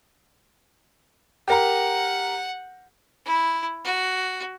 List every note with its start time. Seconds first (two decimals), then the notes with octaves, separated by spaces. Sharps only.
1.48 G4 A#4 F#5 A#5
3.25 E4
3.85 F#4